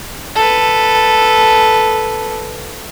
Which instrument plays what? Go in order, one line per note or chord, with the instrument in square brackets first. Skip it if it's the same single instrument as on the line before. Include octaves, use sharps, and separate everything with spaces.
[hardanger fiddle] A4 B4